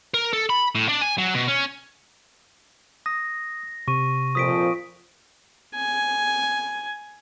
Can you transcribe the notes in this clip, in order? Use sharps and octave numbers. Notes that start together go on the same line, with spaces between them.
A#4
A4
B5
A2
D4
G#5
F#3
B2
C#4
D#6 A#6
C3 C#6 D#7
F2 A#2 F3 D#6 B6 D7
G#5